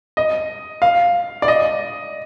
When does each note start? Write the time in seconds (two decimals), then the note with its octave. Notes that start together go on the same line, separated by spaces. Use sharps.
0.17 D#5
0.82 F5
1.42 D5
1.48 D#5